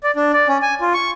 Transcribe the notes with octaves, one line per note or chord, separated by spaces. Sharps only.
D5
D4
D5
C#4
G#5
F4
C#6